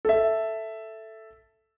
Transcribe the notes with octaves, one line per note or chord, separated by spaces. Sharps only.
A4 E5